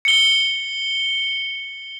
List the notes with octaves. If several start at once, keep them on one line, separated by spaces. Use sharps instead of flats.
C#7 G7